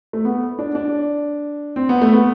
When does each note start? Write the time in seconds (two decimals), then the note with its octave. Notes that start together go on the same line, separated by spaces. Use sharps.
0.13 A3
0.25 B3
0.59 D4
0.75 D4
1.76 C4
1.89 B3
2.02 A3
2.13 B3